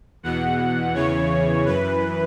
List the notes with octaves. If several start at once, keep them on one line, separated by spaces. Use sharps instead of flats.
E2 B2 F#5
E2 C#3 E3 C#5
F#2 E3 B4